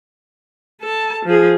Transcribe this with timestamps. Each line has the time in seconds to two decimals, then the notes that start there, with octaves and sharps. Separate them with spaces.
0.81 A4 A5
1.25 F3 G#4